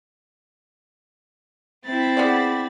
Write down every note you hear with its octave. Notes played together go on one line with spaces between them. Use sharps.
C4 E4 B5 A6
B3 G#4 D5